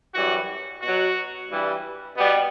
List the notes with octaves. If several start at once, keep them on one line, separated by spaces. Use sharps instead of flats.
F#2 E3 G3 F#4
B2 F#3 F#4
G2 E3 G3
B2 G3 B3